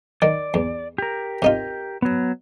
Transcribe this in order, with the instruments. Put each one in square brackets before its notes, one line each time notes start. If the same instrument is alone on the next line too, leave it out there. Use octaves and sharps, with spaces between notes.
[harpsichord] D#3 [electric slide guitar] D5
[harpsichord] E2
[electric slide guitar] G4 A#4
[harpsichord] C3 D#4 F4
[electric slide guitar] F#3 B3